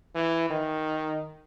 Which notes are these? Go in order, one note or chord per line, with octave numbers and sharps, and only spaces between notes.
E3
D#3